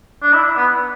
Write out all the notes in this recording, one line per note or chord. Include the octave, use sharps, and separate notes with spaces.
D4
E4
B3